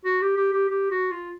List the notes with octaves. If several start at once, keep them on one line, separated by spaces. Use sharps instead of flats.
F#4
G4
G4
G4
G4
F#4
F4